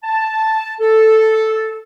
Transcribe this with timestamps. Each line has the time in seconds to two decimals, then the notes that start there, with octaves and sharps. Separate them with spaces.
0.04 A5
0.80 A4